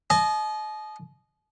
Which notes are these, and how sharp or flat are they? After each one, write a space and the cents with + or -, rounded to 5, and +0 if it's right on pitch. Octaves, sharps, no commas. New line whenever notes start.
D#5 -20 A5 -45